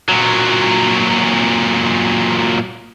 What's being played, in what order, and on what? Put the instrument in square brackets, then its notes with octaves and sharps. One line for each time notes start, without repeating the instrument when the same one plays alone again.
[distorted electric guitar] A#2 F#3